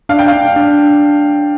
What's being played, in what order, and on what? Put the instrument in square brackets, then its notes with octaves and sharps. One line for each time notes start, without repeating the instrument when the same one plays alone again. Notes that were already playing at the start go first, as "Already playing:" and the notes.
[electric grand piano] D4 [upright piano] F5
[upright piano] G5
[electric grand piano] D4 [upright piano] F5
[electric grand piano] D4